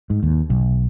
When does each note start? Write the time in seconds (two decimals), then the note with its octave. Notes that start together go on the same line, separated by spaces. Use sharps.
0.10 G#2
0.23 D#2
0.50 B1